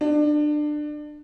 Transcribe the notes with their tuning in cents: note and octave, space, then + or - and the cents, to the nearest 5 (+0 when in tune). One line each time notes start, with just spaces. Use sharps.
D4 +25